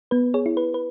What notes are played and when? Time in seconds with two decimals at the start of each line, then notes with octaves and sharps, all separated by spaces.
0.11 B3 B4
0.34 G#4 C#5
0.46 E4
0.57 B4
0.74 B4